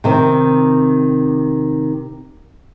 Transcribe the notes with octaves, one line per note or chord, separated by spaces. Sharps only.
C3 D#3 C4